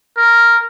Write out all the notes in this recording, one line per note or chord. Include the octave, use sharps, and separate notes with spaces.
A#4